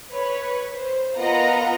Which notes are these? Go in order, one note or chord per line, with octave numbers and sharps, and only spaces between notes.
B4 C#5
C5
B3 F4 A#4 D#5 F#5 A#5